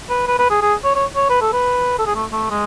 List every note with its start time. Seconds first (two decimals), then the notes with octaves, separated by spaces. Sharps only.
0.10 B4
0.28 B4
0.39 B4
0.50 G#4
0.62 G#4
0.84 C#5
0.95 C#5
1.16 C#5
1.30 B4
1.41 A4
1.53 B4
1.99 A4
2.06 G#4
2.15 A3
2.32 A3
2.50 G#3